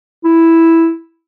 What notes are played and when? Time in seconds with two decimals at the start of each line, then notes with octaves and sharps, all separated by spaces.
0.24 E4